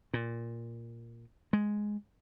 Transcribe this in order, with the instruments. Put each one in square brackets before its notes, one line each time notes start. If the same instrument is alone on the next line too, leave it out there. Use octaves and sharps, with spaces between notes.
[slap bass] A#2
G#3